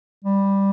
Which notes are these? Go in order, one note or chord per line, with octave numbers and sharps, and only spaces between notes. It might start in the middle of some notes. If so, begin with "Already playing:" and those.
G3